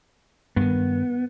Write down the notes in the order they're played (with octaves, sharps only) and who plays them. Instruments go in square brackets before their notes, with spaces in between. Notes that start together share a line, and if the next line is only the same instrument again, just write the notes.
[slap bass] G2 D#3 [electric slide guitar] B3